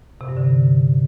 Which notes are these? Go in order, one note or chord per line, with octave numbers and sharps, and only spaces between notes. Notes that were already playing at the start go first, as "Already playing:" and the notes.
C3
G2
D3